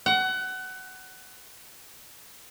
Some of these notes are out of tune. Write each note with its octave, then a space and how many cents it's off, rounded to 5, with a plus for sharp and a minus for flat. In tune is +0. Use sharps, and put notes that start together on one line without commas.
F#5 +25